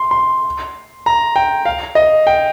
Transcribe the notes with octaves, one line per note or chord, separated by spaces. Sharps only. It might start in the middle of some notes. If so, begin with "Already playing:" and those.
Already playing: C6
C6
A#5
G5
F5
D#5
G5